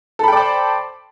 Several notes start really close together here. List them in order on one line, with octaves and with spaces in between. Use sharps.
A4 B5 G5 D5 C5